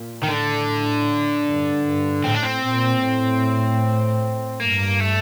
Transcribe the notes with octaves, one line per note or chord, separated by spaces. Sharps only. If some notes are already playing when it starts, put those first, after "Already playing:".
Already playing: A#2
D#3
A2 D3
G2
G2
A2 C4
D4
C4
A#2
A2
G2 A#3
A3